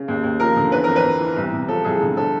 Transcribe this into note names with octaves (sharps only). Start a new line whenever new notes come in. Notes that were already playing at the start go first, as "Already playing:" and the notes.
Already playing: C#3
D#2
D#2
F3 A#4
D3
E3 B4
F2 A#4
B4
F2
E3
C2
C3
F3 A4
C2 G#4
D3
D3 A4